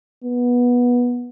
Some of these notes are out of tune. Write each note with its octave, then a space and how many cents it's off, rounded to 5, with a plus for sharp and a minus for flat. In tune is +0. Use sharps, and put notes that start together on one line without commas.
B3 -15